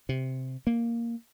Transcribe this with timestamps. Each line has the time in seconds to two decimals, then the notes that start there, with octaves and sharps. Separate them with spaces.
0.09 C3
0.67 A#3